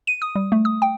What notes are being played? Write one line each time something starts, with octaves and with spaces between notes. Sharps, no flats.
D#7
D#6
G3
A3
D#6
G5